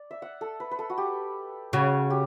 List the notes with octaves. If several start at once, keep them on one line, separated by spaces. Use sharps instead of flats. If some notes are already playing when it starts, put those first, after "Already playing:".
Already playing: D5
E5
F#5
A4
B4
B4
A4
F#4
G4
C#3 F#4
G4